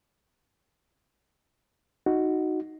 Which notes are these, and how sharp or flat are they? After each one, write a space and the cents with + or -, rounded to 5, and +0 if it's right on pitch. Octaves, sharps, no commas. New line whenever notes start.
D#4 +5 F#4 +0